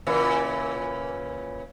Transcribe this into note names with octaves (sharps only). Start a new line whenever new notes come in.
A#2 C#3 E3